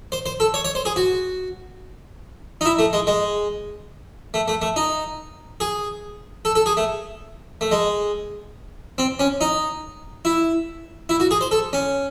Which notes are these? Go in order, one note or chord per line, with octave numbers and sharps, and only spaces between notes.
C5
C5
A4
C#5
C#5
C5
G#4
F#4
D#4
E4
A3
G#3
G#3
A3
A3
A3
D#4
G#4
A4
A4
G#4
A3
A3
G#3
C4
C#4
D#4
E4
E4
F#4
G#4
C5
A4
C#4